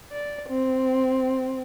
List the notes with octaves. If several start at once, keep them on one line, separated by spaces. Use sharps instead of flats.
D5
C4